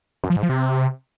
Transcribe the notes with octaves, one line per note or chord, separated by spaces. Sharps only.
F#2
F3
G#2
F3
C3